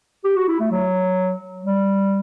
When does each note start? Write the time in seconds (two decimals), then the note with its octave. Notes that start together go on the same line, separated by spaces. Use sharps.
0.24 G4
0.37 F#4
0.48 E4
0.60 A3
0.71 F#3
1.64 G3